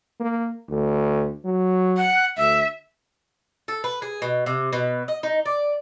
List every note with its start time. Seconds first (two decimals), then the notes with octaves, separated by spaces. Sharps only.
0.20 A#3
0.69 D2
1.45 F#3
1.97 F#5
2.37 D2 E5
3.68 A4
3.84 B4
4.02 G#4
4.22 B2
4.46 C3
4.73 B2
5.08 D#5
5.23 D#4
5.45 D5